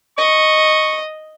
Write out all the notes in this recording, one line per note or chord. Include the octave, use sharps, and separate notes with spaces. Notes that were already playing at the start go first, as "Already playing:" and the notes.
D#5 C#6